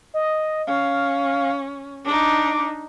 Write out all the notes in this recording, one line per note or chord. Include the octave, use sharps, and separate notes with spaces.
D#5
C#4 F5
D4 D#4 D6